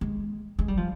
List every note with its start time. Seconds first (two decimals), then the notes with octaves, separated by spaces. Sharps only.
0.01 G#3
0.59 G#3
0.68 G3
0.77 F3